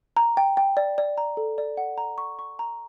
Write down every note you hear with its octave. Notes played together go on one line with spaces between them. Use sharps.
A#5
G5
G5
D5
D5
A#5
A4
D5
F#5
A#5
C#6
C#6
A#5